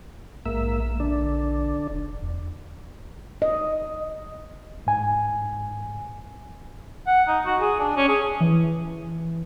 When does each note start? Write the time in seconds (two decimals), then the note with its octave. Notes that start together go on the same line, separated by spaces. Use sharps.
0.46 A#1 G#2 A#3 E5
1.00 D3 D4
1.90 E1
2.23 E2
3.42 D#5
4.87 G#2 G#5
7.07 F#5
7.27 D#4
7.46 F#4
7.60 G#4
7.80 D4
7.97 C#4
8.08 G#4
8.41 E3